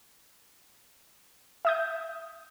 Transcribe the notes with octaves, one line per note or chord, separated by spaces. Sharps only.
E5 D#6 G6